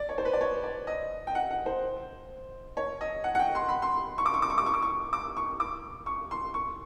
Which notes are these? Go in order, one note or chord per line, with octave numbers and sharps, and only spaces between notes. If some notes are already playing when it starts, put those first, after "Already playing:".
Already playing: D5
C#5
C5
B4
D5
C#5
D5
D#5
G5
F#5
F#5
C5
C#5
D#5
F#5
F#5
G5
C6
B5
C6
C#6
D6
C#6
D6
C#6
D6
C#6
D6
C#6
D6
C#6
D6
C#6
C6
C#6